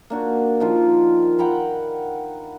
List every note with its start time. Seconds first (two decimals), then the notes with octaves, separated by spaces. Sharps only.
0.10 A#3 D4 F#4
0.60 D#3 F3 F4
1.39 F#5 G5 A#5 B5